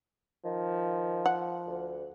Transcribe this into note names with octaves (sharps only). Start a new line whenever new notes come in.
D#3 F3
F#5
D2